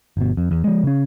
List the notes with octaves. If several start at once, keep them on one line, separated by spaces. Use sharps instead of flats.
G1 B2
F2
E2
F3 G#3
C#3 C#4